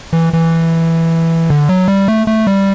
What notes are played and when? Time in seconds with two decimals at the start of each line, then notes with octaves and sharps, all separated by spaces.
0.13 E3
0.33 E3
1.50 D3
1.69 F#3
1.88 G3
2.08 A3
2.27 A3
2.47 G3